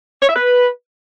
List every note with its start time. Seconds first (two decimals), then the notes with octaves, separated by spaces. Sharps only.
0.22 C#5
0.29 E5
0.36 B4